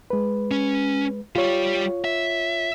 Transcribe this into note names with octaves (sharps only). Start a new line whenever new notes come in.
G#3 B4
C#4
G3 F4 G4 C#5
E5